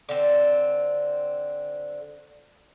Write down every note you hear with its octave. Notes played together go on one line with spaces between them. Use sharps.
D3 C4